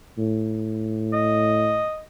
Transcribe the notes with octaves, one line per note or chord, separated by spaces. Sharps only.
A2
D#5